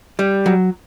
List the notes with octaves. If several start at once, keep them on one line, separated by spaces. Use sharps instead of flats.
G3
F#3